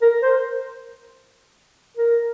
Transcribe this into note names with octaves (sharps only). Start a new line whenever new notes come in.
A#4
C5
A#4